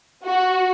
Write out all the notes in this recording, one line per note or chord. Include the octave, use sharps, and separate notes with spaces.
F#4